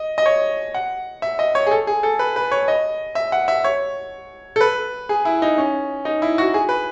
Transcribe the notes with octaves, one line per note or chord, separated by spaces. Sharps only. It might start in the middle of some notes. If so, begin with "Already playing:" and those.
Already playing: D#5
D#5
C#5
F#5
E5
D#5
C#5
G#4
A4
G#4
A4
B4
B4
C#5
D#5
E5
F#5
E5
C#5
A4
B4
G#4
E4
D#4
C#4
D#4
E4
F#4
G#4
B4